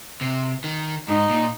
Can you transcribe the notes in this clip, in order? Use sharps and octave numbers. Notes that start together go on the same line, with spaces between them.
C3
D#3
G#2 D#4
A#2